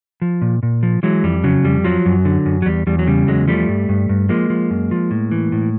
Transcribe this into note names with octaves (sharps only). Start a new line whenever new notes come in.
F3
A#2
A#2
F3
E3 F#3 G#3
F2 G3
C#3 F#3
F2 G3
F3 F#3
F#2
D3
F#2
F#3
E2 G3
E2 G3
F#3
C#3 G3
E2 F#3 G#3
F3 G3 A3
G2
G2
G2
F3 G#3 A#3
F3
F#2
F3
A2
E3
A2